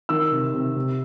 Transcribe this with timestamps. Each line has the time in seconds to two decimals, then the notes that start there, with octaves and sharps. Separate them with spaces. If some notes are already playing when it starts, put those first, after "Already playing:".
0.09 D#3 E6
0.31 C3
0.54 C3
0.76 C3